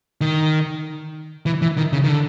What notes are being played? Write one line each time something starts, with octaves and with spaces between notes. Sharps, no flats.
D#3
E3
E3
D#3
C#3
D#3
D3